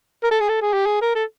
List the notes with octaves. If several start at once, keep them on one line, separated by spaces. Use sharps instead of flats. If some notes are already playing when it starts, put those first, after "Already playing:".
A#4
A4
G#4
A4
G#4
G4
G#4
A#4
A4